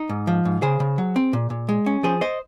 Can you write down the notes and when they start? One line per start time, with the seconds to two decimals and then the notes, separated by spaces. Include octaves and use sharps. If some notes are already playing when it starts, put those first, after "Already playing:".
Already playing: D#4
0.09 G#2
0.27 F3
0.45 G#2
0.62 C#3 G#4 C5
0.80 C#3
0.98 F#3
1.16 C4
1.33 A#2
1.50 A#2
1.69 G#3
1.86 C#4
2.03 F3 G#4 C5
2.21 C5 D#5